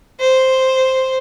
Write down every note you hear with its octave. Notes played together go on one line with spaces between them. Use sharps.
C5